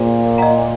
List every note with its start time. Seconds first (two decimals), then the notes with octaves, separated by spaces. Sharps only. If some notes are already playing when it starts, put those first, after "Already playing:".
Already playing: A#2 G#4 C5 F5
0.38 D#5 F#5 A#5